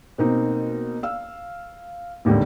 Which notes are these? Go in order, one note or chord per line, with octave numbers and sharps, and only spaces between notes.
B2 A#3 C4 D#4
F5 E6
A1 D#2 G#2 D3 G3